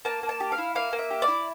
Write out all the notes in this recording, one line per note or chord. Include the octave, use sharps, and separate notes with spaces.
A#3 A5
A#3
A5
G4
F5
E4
A#3 F5
A#3
E5
G4
D5
E4